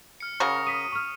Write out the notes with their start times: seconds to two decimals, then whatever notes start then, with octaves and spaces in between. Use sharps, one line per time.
0.20 F6 C#7
0.40 C#3 F#4 A#4 D#6 C#7
0.67 D#6 B6 D#7
0.92 C#6 F6